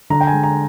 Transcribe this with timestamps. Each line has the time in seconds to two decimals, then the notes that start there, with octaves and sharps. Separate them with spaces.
0.10 D3 A#5
0.21 G5
0.27 G#5
0.32 G#3
0.43 A#5